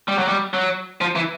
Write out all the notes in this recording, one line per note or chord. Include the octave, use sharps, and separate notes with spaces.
G3
F#3
G3
F#3
F3
E3